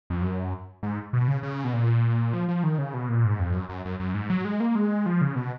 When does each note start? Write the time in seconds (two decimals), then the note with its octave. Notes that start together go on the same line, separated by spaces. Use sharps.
0.10 F2
0.22 F#2
0.83 G#2
1.13 B2
1.28 C#3
1.43 C#3
1.64 B2
1.74 A#2
2.33 F3
2.48 F3
2.63 D#3
2.78 C#3
2.94 B2
3.09 A#2
3.25 G#2
3.40 F2
3.54 F#2
3.69 F#2
3.85 F#2
4.00 F#2
4.14 G#2
4.30 F#3
4.45 G#3
4.60 A#3
4.75 G#3
5.06 F3
5.21 C#3
5.36 B2